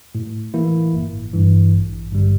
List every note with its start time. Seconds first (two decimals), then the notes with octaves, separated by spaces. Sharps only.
0.15 A2
0.54 E3 A#3 E4
0.94 G1
1.33 G2 E3
1.73 A1
2.13 G2 D3 G3